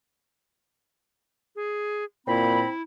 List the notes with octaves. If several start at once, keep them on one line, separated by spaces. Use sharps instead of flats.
G#4
A#2 C4 E4 B5